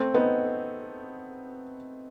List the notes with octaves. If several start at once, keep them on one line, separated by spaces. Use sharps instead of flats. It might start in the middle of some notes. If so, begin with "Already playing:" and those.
Already playing: A3 C4
B3 D#4